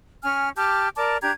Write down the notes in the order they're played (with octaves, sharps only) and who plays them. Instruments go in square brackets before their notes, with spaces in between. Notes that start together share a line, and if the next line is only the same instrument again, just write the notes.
[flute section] C#4 G#5 F6
G4 A5 D6 F6
A#4 D5 A5 D6
D4 G4 A#5 G#6